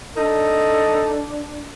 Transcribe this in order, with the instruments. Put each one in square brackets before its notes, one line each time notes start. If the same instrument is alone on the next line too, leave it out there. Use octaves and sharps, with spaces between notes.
[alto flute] D4 [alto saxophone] D#4 [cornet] A4